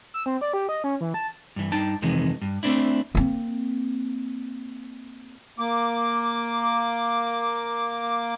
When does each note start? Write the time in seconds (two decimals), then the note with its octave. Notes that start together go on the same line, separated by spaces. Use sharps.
0.14 E6
0.26 C4
0.41 D5
0.53 G4
0.69 D#5
0.84 C#4
1.01 E3
1.14 A5
1.56 G2 E3
1.72 G2 D#4 G5 A5
2.02 F2 C3 D#3 E3 G#3 D#4
2.42 G2
2.63 A3 C4 D4 E4
3.15 A#3 C4
5.59 A#3 D6